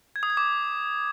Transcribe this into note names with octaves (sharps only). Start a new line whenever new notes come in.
G#6
D#6
G#6
D6